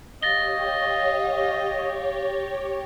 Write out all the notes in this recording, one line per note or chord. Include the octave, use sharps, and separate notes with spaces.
G4 C#5 D#5 F5 A6 A#6 G7